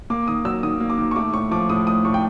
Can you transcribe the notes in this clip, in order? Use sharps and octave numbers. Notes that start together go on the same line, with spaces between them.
A#3 D6
D#3 D#6
F#3 E6
D#3 D#6
A#3
D6
D#3
C#6
A3 D6
A2 C#6
F3 D6
A2 D#6
A3 D#6
A2 C#6
G5